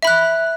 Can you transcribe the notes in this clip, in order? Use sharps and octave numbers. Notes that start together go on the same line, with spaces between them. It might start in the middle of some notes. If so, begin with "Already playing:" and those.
E5 B5 F#6